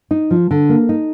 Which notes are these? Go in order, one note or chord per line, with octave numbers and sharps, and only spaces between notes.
D#4
F3
D3
A#3
D#4